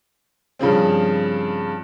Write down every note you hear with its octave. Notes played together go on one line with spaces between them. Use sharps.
G2 C#3 F3 C4